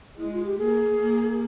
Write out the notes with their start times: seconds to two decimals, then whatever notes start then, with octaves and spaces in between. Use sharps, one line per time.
0.18 G#3 E4
0.31 F4
0.44 G4
0.58 A#3 G#4
0.98 A#3